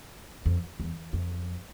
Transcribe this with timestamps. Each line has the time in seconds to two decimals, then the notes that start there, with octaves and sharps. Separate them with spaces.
0.46 F2
0.80 E2
1.13 F2